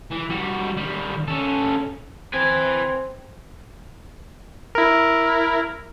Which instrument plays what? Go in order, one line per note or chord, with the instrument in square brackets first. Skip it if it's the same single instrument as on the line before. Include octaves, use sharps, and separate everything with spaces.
[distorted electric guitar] E3
G3 F#4
D#3 G3
C#4 A4
[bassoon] C4 [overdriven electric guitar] B4 G#5
[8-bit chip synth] E4 A#4